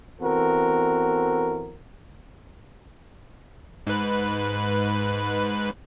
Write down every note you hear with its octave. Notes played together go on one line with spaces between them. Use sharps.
E3 B3 C4 F#4 A4 A#4
G#2 B4